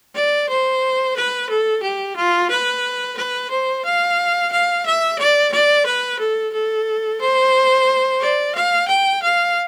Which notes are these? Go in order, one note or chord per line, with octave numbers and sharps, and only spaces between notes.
D5
C5
B4
A4
G4
F4
B4
B4
C5
F5
F5
E5
D5
D5
B4
A4
A4
C5
D5
F5
G5
F5